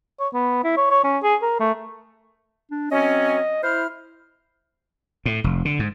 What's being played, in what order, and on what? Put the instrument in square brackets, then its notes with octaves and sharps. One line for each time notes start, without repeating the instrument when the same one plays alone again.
[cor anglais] C#5
B3
E4
C#5
C#5
C#4
G#4
A#4
A3
[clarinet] D4
[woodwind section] F#3 C4 C#4 [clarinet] D#5
[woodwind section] E4 F6 [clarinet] C5
[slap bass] A2
F1
D3
G#2